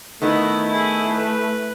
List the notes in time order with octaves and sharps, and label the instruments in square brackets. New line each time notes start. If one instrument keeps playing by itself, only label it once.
[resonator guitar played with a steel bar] D#3 B3 D#5 [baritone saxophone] A3 [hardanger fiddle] E4
[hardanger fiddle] E4 G#4
B4